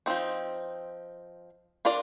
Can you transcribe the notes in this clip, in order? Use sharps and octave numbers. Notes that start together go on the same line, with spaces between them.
F3 C4 D#4
D4 F4 A#4 D5